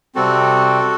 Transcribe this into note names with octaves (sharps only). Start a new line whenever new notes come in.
C3 G3 C4 F#4 A4